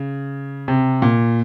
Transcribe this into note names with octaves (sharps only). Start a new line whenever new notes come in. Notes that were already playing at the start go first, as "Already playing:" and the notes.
Already playing: C#3
C3
A#2